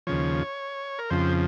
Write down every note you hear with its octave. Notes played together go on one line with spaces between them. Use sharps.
D#2 C#3 F3 C#5
A#4
F2 C#3 F3 C5